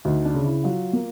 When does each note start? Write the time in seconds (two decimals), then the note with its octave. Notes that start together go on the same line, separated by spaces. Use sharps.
0.05 D2 D#4
0.25 D4
0.35 C#3
0.45 E4
0.64 F#3 F4
0.93 A#3